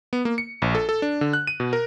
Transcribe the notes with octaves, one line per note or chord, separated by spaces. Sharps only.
B3
A#3
C#7
A#1
A4
A4
D4
D3
F#6
D#7
B2
A#4